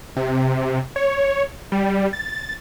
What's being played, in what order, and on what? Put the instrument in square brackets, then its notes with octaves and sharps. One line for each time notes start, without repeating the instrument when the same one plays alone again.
[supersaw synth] C3
C#5
G3
A6